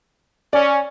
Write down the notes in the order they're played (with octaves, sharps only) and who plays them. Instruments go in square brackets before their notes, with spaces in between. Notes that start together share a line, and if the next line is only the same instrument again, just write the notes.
[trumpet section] C#4 [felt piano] D5